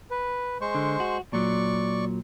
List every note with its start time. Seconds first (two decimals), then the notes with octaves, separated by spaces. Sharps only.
0.11 B4
0.61 G#3 C5 C#6
0.75 D3
1.00 F#4
1.33 A#2 F#3 D5 C#6